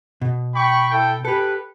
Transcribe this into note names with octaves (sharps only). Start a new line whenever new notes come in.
B2
G5 B5 C#6
E4 A4 G5
G4 A4 B4